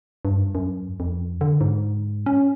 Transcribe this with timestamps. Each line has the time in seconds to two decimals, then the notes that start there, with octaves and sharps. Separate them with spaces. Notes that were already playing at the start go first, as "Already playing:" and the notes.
0.25 G2
0.55 F#2
1.00 F2
1.41 D3
1.61 G#2
2.26 C#4